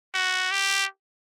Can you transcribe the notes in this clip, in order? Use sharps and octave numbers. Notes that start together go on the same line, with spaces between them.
F#4
G4